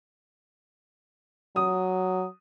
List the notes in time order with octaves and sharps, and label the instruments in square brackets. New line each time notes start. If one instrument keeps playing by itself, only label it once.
[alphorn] F#3 [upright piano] D#6